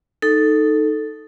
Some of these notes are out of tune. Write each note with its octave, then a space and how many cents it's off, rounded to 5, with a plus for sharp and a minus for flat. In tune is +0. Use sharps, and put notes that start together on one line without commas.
D#4 +0 A4 +0